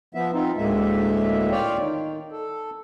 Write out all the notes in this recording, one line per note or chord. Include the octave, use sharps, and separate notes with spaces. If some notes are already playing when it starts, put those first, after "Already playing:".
F3 B3 E5
C4 D#4 F4
D2 A2 G#3 A#3 E5
F4 C#5 D5 F5 G5
D#3
A4